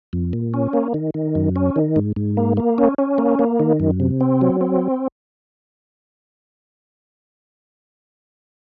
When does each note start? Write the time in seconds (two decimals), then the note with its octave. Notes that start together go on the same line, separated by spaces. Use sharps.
0.13 F2
0.33 A#2
0.54 C#4
0.73 A#3
0.94 D#3
1.14 D#3
1.35 F#2
1.56 C#4
1.76 D#3
1.96 G#2
2.16 G#2
2.37 A#3
2.57 A#3
2.78 C#4
2.98 C#4
3.18 A#3
3.39 A#3
3.60 D#3
3.80 F#2
4.00 C3
4.21 C4
4.41 F#3
4.61 C4